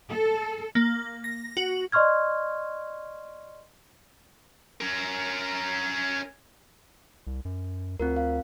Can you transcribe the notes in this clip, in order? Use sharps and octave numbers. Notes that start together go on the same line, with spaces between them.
A4
A#3
A#6
F#4
D5 D#5 C6 C#6 F6 G#6
C#4 A#4
C2
F#2
D2 C4 F4 A#4
F5